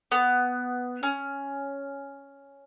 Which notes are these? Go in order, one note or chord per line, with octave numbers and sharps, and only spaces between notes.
B3
C#4